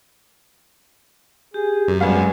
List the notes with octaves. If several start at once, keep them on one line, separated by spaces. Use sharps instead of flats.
G4 G#4
F#2
G#1 G3 G#3 B3 F5